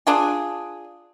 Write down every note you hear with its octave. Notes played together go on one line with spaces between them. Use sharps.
D4 F4 G#4